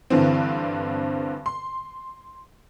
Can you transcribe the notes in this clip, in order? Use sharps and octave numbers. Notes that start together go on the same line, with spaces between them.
G2 D3 E3 C4
C6